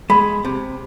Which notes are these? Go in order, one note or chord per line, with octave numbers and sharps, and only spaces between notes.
G#3 B5
C3